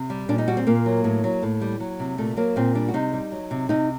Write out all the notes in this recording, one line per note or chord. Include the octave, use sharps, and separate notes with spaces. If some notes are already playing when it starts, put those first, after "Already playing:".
Already playing: C3
G3
A#2 D4
D#4
G3 F#4
C4
A#2 A#3
F#3
A2
F#3
A2
G3
F#3
C3
A#2 A3
F#3 A#3
A#2 C4
G3 D4
F#4
C3 D#4
G3
F#3
C3
C3 D#4